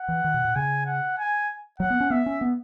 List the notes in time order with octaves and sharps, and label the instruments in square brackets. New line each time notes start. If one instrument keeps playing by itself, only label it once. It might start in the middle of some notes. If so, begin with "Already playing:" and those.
Already playing: [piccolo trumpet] F#5
[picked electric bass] E3
D#3
B2
A#2
[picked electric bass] C#3 [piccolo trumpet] G#5
[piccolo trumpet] F#5
G#5
[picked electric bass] F#3 [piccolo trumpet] F#5
[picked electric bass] B3
C#4
[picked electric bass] B3 [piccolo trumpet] E5
[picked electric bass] C#4
B3